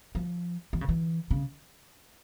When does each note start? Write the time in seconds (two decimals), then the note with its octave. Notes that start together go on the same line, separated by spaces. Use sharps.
0.15 F3
0.73 E3
0.81 C#3
0.89 E3
1.31 C#3